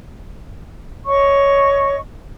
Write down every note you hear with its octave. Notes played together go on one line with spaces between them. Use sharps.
C#5 D#5 C#6